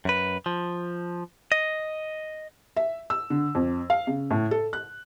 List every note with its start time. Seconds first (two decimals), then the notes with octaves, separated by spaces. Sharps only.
0.05 F#2 B4
0.46 F3
1.52 D#5
2.77 E5
3.10 E6
3.30 D3
3.55 F2
3.90 F5
4.07 C#3
4.31 A2
4.51 A4
4.73 F#6